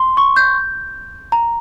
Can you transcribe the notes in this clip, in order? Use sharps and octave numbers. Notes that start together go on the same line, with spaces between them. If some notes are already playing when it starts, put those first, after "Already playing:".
Already playing: C6
C#6
G6
A#5